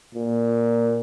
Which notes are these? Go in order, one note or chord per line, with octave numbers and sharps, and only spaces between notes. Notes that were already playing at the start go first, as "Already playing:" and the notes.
A#2